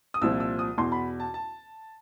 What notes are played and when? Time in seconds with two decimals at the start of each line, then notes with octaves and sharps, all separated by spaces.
0.14 D#6
0.21 C2 A#2 F3 E6
0.40 E6
0.59 D#6
0.78 E2 B2 C6
0.92 B5
1.20 A5
1.34 A5